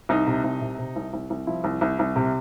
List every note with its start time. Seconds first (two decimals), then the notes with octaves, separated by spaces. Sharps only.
0.09 C2 D#4
0.27 C3
0.44 C2
0.61 C3
0.79 C3
0.96 C2
1.13 C2
1.30 C2
1.47 F3 E4
1.64 C2
1.81 C2
1.99 C2
2.16 C3